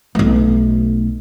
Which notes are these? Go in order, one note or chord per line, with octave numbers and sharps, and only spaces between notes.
B1 A3